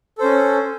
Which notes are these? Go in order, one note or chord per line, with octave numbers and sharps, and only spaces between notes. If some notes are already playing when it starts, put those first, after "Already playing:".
C#4 A4 C5